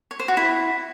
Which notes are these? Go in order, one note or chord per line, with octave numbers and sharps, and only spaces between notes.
C#5
C5
F#4
E4